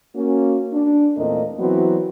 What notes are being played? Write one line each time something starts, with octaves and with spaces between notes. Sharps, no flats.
A#3 C#4 F#4
D4
E2 A#2 A3 C4 A#4 D#5
E3 F#3 B3 C4 E4 F#4